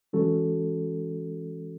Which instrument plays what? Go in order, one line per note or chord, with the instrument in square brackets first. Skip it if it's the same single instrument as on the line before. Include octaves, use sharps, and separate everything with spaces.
[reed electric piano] E3 G#3 C#4 F#4 A4